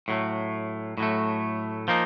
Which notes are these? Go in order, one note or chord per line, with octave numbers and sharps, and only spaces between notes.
A2 F#3 A3
A2 F#3 A3
F3 A#3 D#4